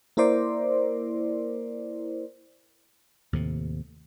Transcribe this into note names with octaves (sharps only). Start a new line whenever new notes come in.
A#3 E4 A#4 C5 D5
D#2 A2 C3